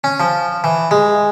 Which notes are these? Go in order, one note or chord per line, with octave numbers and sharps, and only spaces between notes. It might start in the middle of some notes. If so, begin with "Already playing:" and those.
C#4
F3
E3
G#3